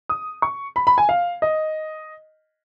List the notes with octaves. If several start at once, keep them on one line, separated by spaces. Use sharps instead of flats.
D#6
C#6
B5
B5
G#5
F5
D#5